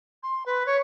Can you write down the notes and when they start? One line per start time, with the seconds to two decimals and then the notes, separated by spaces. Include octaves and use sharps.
0.23 C6
0.46 B4
0.66 C#5